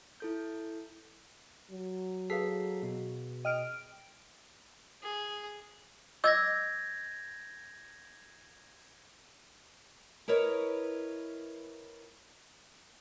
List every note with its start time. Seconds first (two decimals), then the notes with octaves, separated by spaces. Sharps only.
0.20 E4 A4 G6
1.70 F#3
2.30 G#4 A4 B4 F5 B6 C7
2.83 B2
3.45 D#5 G5 F6 D7
5.03 G#4
6.24 D#5 D6 E6 G6 G#6 A#6
10.28 E4 A#4 B4 C#5 D#5